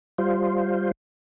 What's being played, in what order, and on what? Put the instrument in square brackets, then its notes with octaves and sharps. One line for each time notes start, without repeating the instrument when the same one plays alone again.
[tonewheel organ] G3 F4 C5